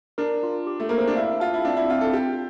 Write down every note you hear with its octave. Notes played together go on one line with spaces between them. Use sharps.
D4 A#4
F4
G4
A3
A#3 A#4
C4
D4
E4 F5
F4 A5
E4
C4 D4
E4
C4 F4
A4
F4 G4